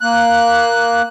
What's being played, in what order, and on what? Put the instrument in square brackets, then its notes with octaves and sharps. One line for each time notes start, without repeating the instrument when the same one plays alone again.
[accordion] A#3 F#6